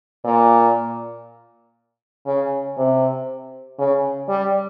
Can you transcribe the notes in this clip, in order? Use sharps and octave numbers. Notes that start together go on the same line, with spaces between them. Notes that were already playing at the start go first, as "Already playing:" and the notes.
A#2
C#3
C3
C#3
G3